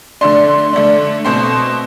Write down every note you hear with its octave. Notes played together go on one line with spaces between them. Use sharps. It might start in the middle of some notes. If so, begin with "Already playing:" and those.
D3 A3 D4 C6
D3 A3 D4
B2 A3 C4 C6